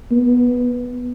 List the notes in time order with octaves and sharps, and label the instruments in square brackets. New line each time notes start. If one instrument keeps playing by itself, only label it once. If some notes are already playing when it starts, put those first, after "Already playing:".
[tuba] B3